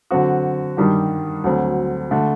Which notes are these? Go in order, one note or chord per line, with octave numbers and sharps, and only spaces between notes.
D3 F#3 C4 F#4
G2 D#3 G3 D4 G4
D2 D3 F#3 C4
D3 A3